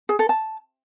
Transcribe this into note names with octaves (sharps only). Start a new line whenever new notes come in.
G#4
A4
A5